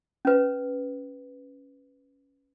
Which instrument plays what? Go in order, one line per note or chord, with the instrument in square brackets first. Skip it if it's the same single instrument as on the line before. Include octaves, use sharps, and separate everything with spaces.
[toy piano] C#4 B4